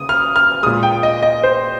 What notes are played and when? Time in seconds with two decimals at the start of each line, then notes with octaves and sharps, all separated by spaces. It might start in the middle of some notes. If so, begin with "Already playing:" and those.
Already playing: C#3 D#6
0.09 F6
0.36 F6
0.63 A#2 G#3 D#6
0.83 G5
1.03 D#5
1.22 D#5
1.43 C5